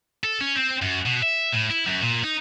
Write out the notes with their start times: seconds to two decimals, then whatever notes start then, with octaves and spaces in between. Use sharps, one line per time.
0.24 A4
0.41 C#4
0.56 C4
0.82 F#2
1.06 B2
1.23 E5
1.53 A2
1.71 E4
1.87 F#2
2.03 A#2
2.24 D#4